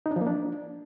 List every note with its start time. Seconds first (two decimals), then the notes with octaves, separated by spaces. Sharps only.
0.06 D#4
0.11 D4
0.16 F3
0.21 A#3
0.27 D4